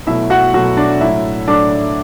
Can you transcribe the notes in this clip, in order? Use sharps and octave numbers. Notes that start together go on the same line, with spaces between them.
B2 F#3 A3 E4 E5
F#4 F#5
B2 F#3 A3 F#4 F#5
D4 D5
A2 F#3 A3 E4 E5
A2 F#3 A3 D4 D5